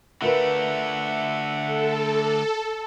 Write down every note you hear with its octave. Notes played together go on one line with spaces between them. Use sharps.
D3 A3 F4 A#4 B4 E5 F#5
A4